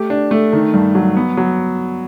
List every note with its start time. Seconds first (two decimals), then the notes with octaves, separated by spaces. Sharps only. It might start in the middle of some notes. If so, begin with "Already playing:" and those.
Already playing: A3 G4
0.10 D4
0.31 A3
0.53 D#3
0.74 G2
0.95 F#3
1.17 B3
1.37 F#3